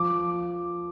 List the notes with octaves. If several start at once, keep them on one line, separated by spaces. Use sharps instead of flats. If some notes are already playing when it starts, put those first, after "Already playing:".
Already playing: F3 D6